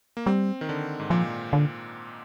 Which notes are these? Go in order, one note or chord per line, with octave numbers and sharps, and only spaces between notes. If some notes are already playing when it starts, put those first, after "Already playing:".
A#3
G3 C4
D#3
D3
G#2
A#2 F3
D3